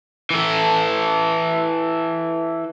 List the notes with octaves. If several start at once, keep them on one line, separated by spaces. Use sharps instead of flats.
E3 A4